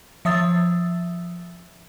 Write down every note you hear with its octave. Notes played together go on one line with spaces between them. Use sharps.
F3 E5 D#6 E6 A6